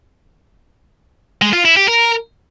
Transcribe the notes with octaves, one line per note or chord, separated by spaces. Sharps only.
G#3
F4
E4
G4
A#4